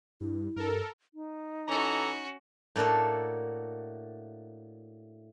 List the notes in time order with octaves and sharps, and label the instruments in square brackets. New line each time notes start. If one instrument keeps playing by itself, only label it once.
[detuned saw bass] G2 [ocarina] E4
[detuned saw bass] G2 [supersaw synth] A4 A#4
[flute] D#4
[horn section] E3 A4 A#5 [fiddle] C#4 F#4
[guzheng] A2 A#3 D4 F#4 A4